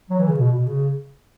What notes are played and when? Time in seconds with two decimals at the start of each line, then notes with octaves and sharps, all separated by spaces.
0.10 F#3
0.20 E3
0.29 C#3
0.38 B2
0.52 B2
0.66 C#3